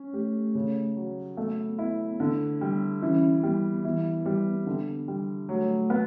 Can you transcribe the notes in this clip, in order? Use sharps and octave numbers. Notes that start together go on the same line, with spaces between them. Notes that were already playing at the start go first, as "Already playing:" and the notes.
Already playing: C#4
A3 G4
C#3
F#3
A3 B3
B3 E4
D3 B3
G3
E3 C#4
G3 B3
E3 B3
G3
D3
G3
F#3 A3
B3